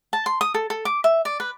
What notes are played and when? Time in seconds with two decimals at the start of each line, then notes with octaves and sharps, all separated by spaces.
0.13 A5
0.26 C6
0.41 D#6
0.54 A4
0.70 A4
0.85 D6
1.04 E5
1.25 D5
1.40 B4